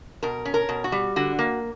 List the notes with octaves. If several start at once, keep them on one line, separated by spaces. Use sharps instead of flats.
B2 A#4
C#4
A#4
B2
F#4
G3
D3 F#4
A#3